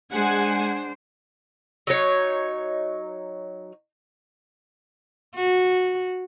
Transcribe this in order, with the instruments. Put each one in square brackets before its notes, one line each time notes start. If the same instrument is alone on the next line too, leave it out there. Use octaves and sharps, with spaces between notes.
[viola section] G#3 F#5 G#5 [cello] D4 C5
[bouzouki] F#3 D#4 C#5
[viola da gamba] F#4